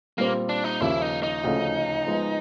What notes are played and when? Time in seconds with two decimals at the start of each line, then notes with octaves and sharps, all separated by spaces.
0.18 A#2 G3 A#3 C4 F4
0.49 D4
0.64 D#4
0.81 D#2 C#3 F3 A#3 E4
1.02 D#4
1.23 D#4
1.44 D2 C#3 F3 A3
2.07 F3 G#3 B3